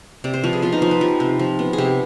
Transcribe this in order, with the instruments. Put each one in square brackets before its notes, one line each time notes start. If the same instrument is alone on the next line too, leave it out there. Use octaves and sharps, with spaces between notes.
[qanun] C3 D5
C5
F3 B4
G#4
B3 F4
D#4
F3 C5
B4
F3 G4
C3
F3
B3
G#4
C3 G4